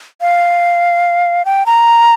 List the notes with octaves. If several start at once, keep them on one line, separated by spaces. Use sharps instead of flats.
F5
G5
A#5